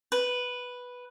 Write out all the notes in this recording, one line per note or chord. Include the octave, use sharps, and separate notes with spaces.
B4